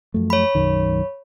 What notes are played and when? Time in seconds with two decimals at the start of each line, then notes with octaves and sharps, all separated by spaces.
0.14 F#2 F3 A3
0.30 C#5 B5
0.55 B1 F#2 D#3